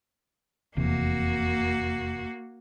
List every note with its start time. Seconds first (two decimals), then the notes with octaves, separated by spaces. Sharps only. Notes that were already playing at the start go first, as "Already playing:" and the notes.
0.77 F1 E2 C3 A#3 F#4